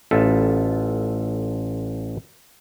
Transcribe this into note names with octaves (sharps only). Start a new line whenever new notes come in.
A1 F4 A4 E5